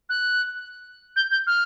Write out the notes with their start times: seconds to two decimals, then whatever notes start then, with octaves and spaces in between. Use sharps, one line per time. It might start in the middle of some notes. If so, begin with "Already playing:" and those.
0.09 F#6
1.16 G6
1.31 G6
1.47 F6